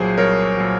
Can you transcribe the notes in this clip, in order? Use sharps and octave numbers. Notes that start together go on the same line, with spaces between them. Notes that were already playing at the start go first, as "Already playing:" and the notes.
Already playing: C2 A#2 F#3 G#4 C5
C2 A#4 C#5
A#2 F#3